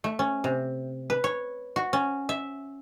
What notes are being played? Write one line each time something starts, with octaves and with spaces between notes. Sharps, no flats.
A3
C#4
C3
B4
C#5
F#4
C#4
E5